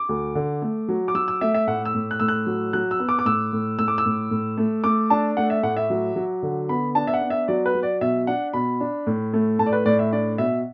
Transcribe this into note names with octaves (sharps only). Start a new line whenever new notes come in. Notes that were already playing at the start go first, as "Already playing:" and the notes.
Already playing: D6
D2
D3
A3
F#3
D6
F#3 E6
E6
A3 E5
E5
A2 F#5
E6
A2
F#6
A2 E6
F#6
F#3
F#3 F#6
E6
B3
D6
D6
A2 E6
A2
A2 E6
D6
E6
A2
A2
A3
A3 D6
D4 A5
A3 F#5
E5
A2 F#5
E5
F#3
F#3
D3
B3 B5
D4 A5
E5
F#5
B3
E5
F#3 D5
B4
F#3
D5
B2 E5
D4 F#5
B2 B5
D4
A2
A3
A2 A5
D5
B4
A2 D5
E5
D4 D5
B2 E5